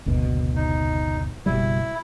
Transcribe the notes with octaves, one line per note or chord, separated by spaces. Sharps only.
F#1 D2 B2
D#4
F#1 B2 G3 E4